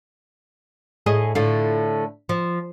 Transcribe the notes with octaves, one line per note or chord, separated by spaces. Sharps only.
A2 G#4 D#5
A2 D3 F4
F3